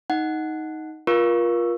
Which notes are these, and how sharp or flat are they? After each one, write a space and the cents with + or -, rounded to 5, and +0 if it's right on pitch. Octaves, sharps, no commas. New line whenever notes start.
D#4 +10 F#5 +0
F4 +0 A#4 +35 C#6 +0